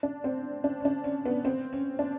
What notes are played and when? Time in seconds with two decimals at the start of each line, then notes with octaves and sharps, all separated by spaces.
0.03 D4
0.24 C4
0.64 D4
0.80 C#4
0.85 D4
1.04 C#4
1.26 B3
1.45 C4
1.73 C#4
1.99 D4